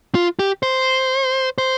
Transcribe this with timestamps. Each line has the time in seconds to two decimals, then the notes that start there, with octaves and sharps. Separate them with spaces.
0.15 F4
0.39 G4
0.63 C5
1.58 C5